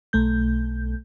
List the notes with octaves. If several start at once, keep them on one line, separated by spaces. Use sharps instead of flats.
B1 A3 G6